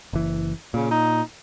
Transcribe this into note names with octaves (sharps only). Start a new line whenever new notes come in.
F#1 E3
A#2 C#3
D#4